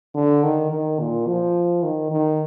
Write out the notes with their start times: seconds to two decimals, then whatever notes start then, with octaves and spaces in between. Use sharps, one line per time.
0.15 D3
0.43 D#3
0.71 D#3
1.00 A#2
1.27 F3
1.83 D#3
2.11 D#3